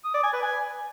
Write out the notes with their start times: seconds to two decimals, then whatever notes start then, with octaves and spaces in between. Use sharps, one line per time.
0.04 D#6
0.14 D5
0.23 G#5
0.33 B4
0.42 G#5